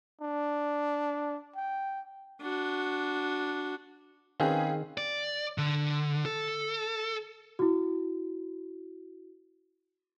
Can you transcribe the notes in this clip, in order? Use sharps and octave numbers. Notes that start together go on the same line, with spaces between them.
D4
G5
D4 F#4
D#3 C4 C#4 G#4 B4 F5 G5
D5
D3
A4
E4 F#4